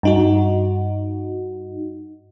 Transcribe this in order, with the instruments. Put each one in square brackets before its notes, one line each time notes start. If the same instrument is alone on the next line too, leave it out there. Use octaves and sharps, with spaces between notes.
[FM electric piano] G2 D#4 F#4